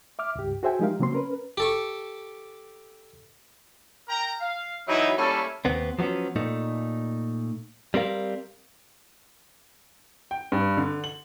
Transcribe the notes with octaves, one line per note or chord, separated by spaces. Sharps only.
E5 D6 F6
C#2 G2 G4
F#4 G#4 C5 E5 G5 G#5
F3 G#3 D#4 G4 A#4 F5
C#3 F#3 A#3 C4 C6
C#4 A#4 B4
G4 A4 C#6
A#4 G5 A#5
F5
E3 F#3 D#4 E4
G3 A3 A#3 C#4 E4 A4
D#2 B3 C4
F3 F#3 B3 C#4
A#2 A3 D#4
G3 C4 A#4 F5
G5
G2
D3
F#7